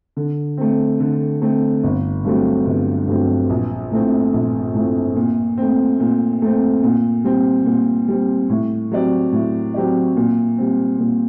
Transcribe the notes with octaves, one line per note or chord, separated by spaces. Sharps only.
D3
A3 C4
D3
A3 C4
G1
G2 F#3 A3 C4
G1
G2 F#3 A3 C4
A#1
A2 A3 C4
A#1
A2 A3 C4
A#2
A3 C4
A#2
A3 C4
A#2
G3 C4
A#2
G3 C4
A2
F#3 C4 G4 D5
A2
F#3 C4 G4 D5
A#2
G3 C4
A#2